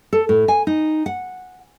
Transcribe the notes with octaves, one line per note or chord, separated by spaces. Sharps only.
A4
A2
G#5
D#4
F#5